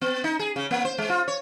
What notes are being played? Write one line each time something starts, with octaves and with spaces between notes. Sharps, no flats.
B3
D#4
G#4
C#3
A#3
C5
G#3
F4
C#5